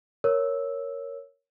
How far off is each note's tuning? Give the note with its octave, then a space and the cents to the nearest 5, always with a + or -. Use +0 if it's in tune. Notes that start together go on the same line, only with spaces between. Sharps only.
A#4 +0 C#5 +0 E6 -10